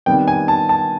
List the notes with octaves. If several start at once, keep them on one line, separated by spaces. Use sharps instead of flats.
C3 D#3 G3 B3 G5
G#5
A5
A5